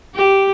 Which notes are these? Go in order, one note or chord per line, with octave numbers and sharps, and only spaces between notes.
G4